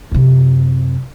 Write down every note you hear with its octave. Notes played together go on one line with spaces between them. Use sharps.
F#2 C3